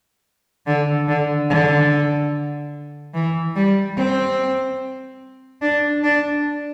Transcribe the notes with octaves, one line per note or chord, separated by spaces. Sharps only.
D3
D3
D3
E3
G3
C4
D4
D4